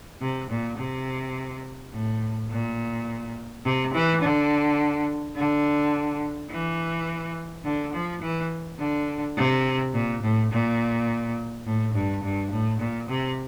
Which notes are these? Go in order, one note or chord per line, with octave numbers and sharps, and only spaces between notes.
C3
A#2
C3
A2
A#2
C3
E3
D3
D3
E3
D3
F3
E3
D3
C3
A#2
A2
A#2
A2
G2
G2
A2
A#2
C3